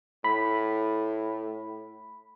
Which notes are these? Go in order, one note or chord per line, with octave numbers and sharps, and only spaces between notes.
A2 B5